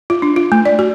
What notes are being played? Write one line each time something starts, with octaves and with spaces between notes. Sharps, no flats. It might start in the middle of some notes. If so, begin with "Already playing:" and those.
F4
D4
F4
A3
D5
F#4